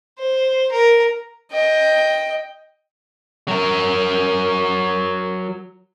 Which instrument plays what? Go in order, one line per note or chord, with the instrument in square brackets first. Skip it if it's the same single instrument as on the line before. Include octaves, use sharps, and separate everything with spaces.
[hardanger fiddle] C5
A#4
D#5 G5
[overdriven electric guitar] F#3 A#4